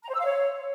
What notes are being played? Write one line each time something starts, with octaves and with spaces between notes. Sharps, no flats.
A#5
C5
E6
F5
C#5